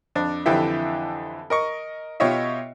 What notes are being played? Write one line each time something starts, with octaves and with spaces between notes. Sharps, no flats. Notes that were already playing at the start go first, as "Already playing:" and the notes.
F2 D4
F2 D3 E3 G4 E5
A#4 D#5 C#6
B2 F4 G4 C#5 D#5 E5